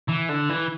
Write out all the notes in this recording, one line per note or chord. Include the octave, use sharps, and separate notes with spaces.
E3
D3
E3